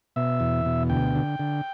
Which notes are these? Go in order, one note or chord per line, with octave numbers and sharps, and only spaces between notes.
B2 E5
E2
B2
D2 G5
D3
D3